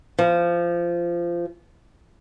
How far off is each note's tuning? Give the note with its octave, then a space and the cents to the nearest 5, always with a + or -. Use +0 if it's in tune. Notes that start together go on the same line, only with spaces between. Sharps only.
F3 -20